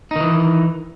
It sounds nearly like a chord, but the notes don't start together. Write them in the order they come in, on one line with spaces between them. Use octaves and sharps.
D#4 D#3 E3